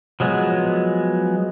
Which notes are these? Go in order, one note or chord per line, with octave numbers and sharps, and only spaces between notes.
F3 F#3 G#3 B3